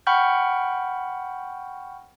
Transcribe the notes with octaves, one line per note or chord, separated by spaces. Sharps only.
F#5 G5 B5 C#6 F6 G6